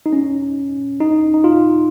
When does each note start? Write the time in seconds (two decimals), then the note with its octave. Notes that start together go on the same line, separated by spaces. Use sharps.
0.06 D#4
0.13 C#4
1.01 D#4
1.34 D#4
1.44 F4